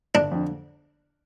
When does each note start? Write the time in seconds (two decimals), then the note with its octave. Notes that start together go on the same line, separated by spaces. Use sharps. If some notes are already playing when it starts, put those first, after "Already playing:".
0.15 G1 D4
0.31 F2 D3